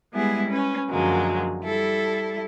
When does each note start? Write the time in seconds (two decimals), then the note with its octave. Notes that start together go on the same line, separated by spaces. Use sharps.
0.13 G3 G#3 B3 E4 G#4
0.50 C#4 B4
0.89 F#2 D3 F3 F#3 G#3 A#3
1.63 G3 E4 A4